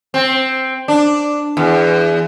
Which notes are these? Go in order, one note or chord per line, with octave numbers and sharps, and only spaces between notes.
C4
D4
E2